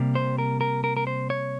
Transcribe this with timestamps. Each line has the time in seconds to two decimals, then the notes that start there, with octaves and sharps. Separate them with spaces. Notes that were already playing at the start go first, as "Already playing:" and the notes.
Already playing: C3 G3 A#3
0.15 C5
0.38 A#4
0.61 A#4
0.84 A#4
0.97 A#4
1.07 C5
1.30 C#5